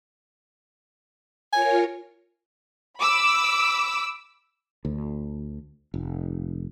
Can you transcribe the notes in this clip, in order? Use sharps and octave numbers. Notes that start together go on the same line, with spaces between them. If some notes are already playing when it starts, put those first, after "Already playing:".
F4 A#4 C#5 G#5
B5 D6 E6
D2
F1